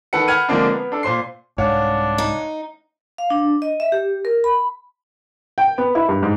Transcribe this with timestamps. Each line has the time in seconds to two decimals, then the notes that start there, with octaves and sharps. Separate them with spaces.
0.13 D#3 A4 B4 F#5 C#7
0.28 F#5 B5 F6 G#6 D#7
0.49 D3 F3 G#3 A#3 C4 D4
0.71 B3
0.92 D4 A4
1.03 A#2 C5 C6 C7
1.58 C2 G#2 D4 C#5 F5 F#5
2.18 D#4
3.18 F5
3.30 D4
3.62 D#5
3.80 E5
3.92 G4
4.25 A#4
4.44 B5
5.58 G5
5.78 B3
5.95 E4
6.09 G2
6.22 G#2